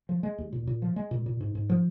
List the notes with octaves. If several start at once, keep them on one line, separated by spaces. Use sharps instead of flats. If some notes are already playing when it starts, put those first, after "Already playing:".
F3
G#3
D#2
A#2
A#2
F3
G#3
A#2
A#2
G#2
G#2
F3